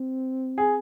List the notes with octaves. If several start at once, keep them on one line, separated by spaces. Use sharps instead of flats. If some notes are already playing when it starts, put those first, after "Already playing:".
Already playing: C4
G#4